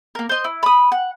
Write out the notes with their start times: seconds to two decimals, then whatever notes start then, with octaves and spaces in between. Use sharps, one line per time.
0.15 A#3 A#4
0.29 C5 D#5
0.44 E4
0.63 B5 D#6
0.92 F#5